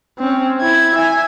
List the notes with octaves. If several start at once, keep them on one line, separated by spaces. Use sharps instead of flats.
C4 C#4
E4 G#6
E5 G#5